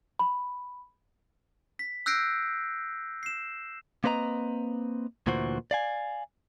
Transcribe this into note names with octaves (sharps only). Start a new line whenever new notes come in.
B5
B6
E6 F#6 G6 A#6 C7 D7
C7 E7
A#3 C4 B4 D#5 A#5
D2 A#2 E3 F#4 C5
D5 F5 G#5